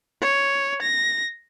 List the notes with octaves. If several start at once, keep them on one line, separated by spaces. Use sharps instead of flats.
C#5
A#6